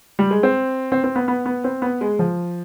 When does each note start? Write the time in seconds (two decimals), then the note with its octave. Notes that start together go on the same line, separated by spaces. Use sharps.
0.19 G3
0.31 G#3
0.43 C4
0.92 C4
1.04 C4
1.16 B3
1.28 B3
1.46 B3
1.64 C4
1.82 B3
2.01 G#3
2.19 F3